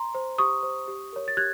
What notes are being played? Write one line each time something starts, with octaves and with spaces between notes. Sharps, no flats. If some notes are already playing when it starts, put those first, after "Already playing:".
Already playing: A#5 C6
C5
G4 C#6 D#6
C5
G4
A#4 C#5
A6
G4 F#6 G#6